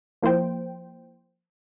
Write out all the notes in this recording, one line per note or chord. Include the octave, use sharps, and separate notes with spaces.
F3 A#3 E4 C5 G5